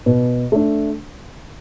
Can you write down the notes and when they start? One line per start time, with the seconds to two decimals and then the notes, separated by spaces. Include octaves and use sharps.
0.06 B2
0.52 A3 D4